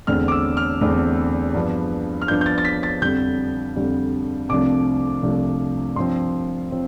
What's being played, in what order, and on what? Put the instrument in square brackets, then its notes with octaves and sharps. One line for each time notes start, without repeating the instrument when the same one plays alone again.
[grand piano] E2 D3 A3 C4 F6
D6
E6
F6
E2 D3 A3 C4
G2 F3 B3 D4
F6
G2 F3 B3 D4 G6
G6
A6
A6
B6
A6
F2 D3 G3 G6
F2 D3 G3
C2 C3 F3 A3 D4 D6
C2 C3 F3 A3 D4
G2 F3 C4 C6
F3 C4